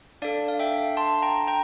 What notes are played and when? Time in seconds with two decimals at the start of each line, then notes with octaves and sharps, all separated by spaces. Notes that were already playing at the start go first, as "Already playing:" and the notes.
0.22 D4 A4 D5 F5
0.48 F5
0.59 E5 G5
0.97 A5 C6
1.22 G5 A#5
1.47 G5 A#5